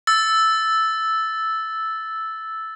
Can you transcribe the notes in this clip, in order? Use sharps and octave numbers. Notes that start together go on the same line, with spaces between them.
E6 A6